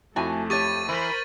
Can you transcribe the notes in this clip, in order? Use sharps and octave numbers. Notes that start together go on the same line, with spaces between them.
F2 A3 E4 F#4 G#5 A5
G4 C#5 C#6 A6 D#7
E3 A#4 C5 B5